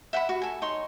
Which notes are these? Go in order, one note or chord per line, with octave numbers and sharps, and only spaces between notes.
E5 F#5 G5 B5
F#4
A4 G#5
D#4 C#5 C6